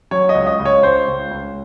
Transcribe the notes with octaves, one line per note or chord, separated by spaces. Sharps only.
F#3 C#5
D#5
C#2
D#5
C#2
C#5
C#2 C5
C#2
C#2